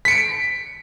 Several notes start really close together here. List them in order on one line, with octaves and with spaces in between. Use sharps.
B6 C#7 D7